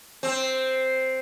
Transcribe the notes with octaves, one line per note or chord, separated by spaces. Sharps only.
C4